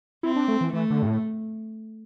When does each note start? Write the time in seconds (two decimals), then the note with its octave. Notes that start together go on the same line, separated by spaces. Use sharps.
0.23 C4 E4
0.36 D4
0.48 A3
0.61 E3
0.73 E3 A3
0.90 D3
1.02 G2
1.06 A2